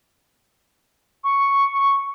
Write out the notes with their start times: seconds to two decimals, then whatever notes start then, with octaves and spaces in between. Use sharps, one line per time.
1.24 C#6